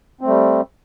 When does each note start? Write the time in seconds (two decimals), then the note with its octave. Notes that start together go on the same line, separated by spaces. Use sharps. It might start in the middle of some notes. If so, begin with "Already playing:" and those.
0.21 C4
0.24 A3
0.28 G3